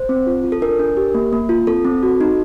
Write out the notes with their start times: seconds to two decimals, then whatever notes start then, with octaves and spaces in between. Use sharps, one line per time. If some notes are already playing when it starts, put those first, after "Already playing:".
Already playing: C5
0.09 C4
0.27 F4
0.44 F4
0.52 A4
0.62 D4 A#4
0.79 D4
0.97 G4
1.14 A#3
1.33 A#3
1.49 F4
1.67 C4 A4
1.85 C4
2.03 F#4
2.21 D#4